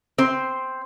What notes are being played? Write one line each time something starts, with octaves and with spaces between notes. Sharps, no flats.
C4 C5